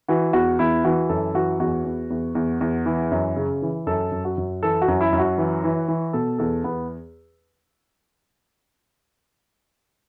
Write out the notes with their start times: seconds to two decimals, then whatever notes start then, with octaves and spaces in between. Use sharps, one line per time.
0.08 E3 F#4
0.33 E2 F#4
0.59 E2 E4
0.84 E3 F#4
1.09 F#2 A4
1.34 E3 F#4
1.59 E2 F#4
1.85 E2
2.10 E2
2.35 E2
2.61 E2
2.86 E3
3.11 F#2
3.36 C#3
3.62 E3
3.87 F#2 A4
4.11 F#2
4.25 F#4
4.38 F#2
4.63 E3 A4
4.82 F#4
4.88 F#2
5.01 E4
5.13 F#2
5.19 F#4
5.38 E3
5.64 E3
5.88 E3
6.13 B2 A4
6.38 E2 A4
6.64 E2 B3